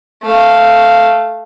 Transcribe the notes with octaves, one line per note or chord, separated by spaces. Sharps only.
A3 F5